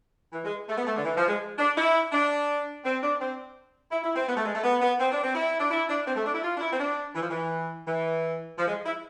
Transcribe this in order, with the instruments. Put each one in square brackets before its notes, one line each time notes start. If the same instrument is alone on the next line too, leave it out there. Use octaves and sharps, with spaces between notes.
[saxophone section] E3
G#3
A3
B3
A3
D3
E3
F3
G#3
D4
E4
D4
C4
D4
C4
E4
E4
C4
B3
A3
G#3
A3
B3
B3
C4
D4
C4
E4
D4
E4
D4
C4
A3
D4
E4
F4
D4
E4
C4
D4
E3
F3
E3
E3
F3
G#3
E4